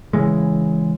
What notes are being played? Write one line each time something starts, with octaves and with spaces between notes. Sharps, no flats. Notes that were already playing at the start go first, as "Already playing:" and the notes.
C#3 E3 G#3